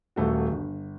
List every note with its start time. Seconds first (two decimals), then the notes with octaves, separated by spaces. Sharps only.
0.16 D#1 A3 F#4
0.52 G1